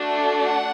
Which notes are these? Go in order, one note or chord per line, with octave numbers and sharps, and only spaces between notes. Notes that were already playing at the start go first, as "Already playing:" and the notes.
Already playing: A3 D4 F#4
F#5